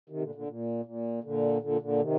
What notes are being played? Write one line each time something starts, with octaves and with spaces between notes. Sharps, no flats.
C3 D#3
A#2 D3
A#2 D3
A#2
A#2
A#2 D3
A#2 D3
A#2 D3
C3 D#3